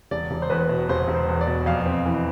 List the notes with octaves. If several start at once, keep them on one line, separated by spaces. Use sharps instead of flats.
E1 D5
E1
C5
E2 B4
B2
E1 C5
E1
C5
E2
D5
B2
F2 F5
C4
E3